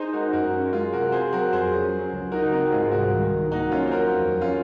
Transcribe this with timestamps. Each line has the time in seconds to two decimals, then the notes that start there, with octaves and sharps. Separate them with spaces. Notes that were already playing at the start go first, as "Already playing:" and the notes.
Already playing: D#4 G#4 C5
0.13 G#3 F#4 A#4
0.33 F#2 F#4 A#4
0.53 C#4
0.73 G#3 F4 G#4
0.93 C3 F#4 A#4
1.12 C4 G#4 C5
1.33 F#3 F#4 A#4
1.53 F2 G#4 C5
1.73 C#4
1.92 F#3
2.12 C#2
2.32 D#4 F#4 A#4
2.52 C4 F#4 A#4
2.72 G#2 F4 G#4
2.92 C2 F#4 A#4
3.12 D#3
3.32 C2
3.52 A#3 D#4 F#4
3.72 F#3 C#4 F4
3.87 C5
3.92 D#2 F#4 A#4
4.12 F2
4.31 F#3
4.41 C#4 F4